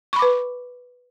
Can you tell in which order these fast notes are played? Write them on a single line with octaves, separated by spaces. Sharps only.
C#6 B5 D6 B4